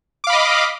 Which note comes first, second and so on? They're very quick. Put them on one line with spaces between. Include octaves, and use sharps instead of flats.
D6 F5 B5 D#5